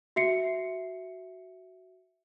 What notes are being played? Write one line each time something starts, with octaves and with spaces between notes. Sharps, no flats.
F#4 E5 C7 C#7